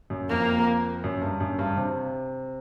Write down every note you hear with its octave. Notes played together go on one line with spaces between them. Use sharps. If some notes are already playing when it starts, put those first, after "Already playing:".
F#2
F2 A#3
F#2
G2
F#2
G2
C3